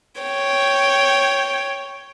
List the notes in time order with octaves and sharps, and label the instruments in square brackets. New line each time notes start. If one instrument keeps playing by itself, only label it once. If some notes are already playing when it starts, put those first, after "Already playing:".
[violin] C#5 G5